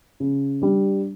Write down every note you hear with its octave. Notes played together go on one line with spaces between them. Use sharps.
C#3
G3 D4